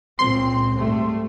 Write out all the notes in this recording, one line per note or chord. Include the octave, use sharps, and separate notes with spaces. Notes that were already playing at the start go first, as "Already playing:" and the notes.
C#2 A#2 C4 C6
G#2 G3 A3